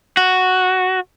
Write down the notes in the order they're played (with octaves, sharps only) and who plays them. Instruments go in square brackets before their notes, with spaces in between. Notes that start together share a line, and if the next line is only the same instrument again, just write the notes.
[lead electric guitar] F#4